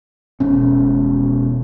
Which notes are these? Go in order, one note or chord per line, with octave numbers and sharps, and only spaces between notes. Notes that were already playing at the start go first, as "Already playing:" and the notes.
E1 B2 C#4